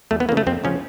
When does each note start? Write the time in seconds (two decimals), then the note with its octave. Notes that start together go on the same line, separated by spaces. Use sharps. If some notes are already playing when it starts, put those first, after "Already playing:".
0.11 E2 A3
0.20 B3
0.29 C#3 E3 A#3
0.37 A3
0.47 F2 C4
0.64 C#3 F3 C#4